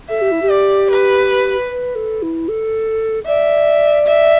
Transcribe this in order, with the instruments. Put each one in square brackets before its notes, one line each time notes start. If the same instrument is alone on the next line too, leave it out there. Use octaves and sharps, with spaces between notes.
[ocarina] A4 [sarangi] E5
[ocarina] G4
E4
G4
[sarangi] D5
B4
[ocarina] B4
A4
E4
A4
[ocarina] D5 [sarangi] E5
[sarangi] E5